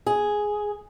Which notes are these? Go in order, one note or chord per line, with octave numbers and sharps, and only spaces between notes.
G#4